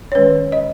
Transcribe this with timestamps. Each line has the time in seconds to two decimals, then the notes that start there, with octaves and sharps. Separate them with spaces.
0.12 C#5
0.15 D#3 G#3 C#4 B4
0.52 D#5